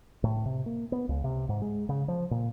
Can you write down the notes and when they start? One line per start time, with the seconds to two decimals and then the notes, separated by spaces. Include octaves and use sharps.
0.24 A2
0.46 C3
0.66 A#3
0.92 B3
1.09 C#2
1.24 C3
1.49 G#2
1.62 G#3
1.89 C#3
2.08 F3
2.31 A#2